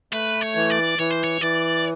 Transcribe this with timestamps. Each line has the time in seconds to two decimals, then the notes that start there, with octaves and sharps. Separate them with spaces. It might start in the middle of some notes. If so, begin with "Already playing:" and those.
0.13 A3 B4
0.42 C#5
0.55 E3
0.70 D5
0.99 E3 C#5
1.11 C5
1.24 C#5
1.41 E3 D5